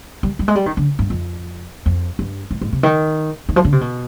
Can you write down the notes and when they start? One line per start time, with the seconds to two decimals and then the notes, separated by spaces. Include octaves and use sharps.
0.23 G3
0.39 G3
0.48 G#3
0.55 G3
0.66 D#3
0.77 D3
0.99 G2
1.10 F2
1.86 F2
2.19 G2
2.51 G#2
2.61 G#2
2.73 C3
2.83 D#3
3.49 D#3
3.56 F3
3.65 D3
3.73 C3
3.81 B2